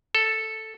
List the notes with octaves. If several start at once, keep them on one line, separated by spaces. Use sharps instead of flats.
A4